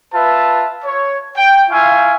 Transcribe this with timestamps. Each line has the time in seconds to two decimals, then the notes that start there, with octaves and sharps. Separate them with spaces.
0.14 F4 B4 E5 A5
0.84 C#5
1.37 G5
1.70 E4 F4 E5 F5 G#5 C#6